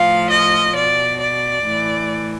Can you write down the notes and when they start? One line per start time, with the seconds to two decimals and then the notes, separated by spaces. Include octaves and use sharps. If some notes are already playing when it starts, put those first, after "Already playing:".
Already playing: A2 F3 F5
0.31 D#5
0.75 B2 D5
1.20 D5
1.66 A2 E3